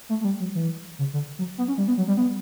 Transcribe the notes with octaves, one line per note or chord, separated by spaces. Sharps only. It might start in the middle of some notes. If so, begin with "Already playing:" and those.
A3
A3
G3
F#3
E3
C#3
D3
F#3
B3
C#4
G3
B3
F#3
G3
B3